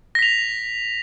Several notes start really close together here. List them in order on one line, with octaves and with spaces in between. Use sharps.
A#6 B6 F7